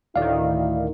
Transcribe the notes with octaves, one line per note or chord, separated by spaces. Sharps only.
D2 A2 D#3 E4 D5 F5